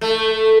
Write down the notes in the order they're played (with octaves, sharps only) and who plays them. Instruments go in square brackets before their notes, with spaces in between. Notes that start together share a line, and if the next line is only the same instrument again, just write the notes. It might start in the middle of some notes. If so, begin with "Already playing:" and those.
[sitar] A3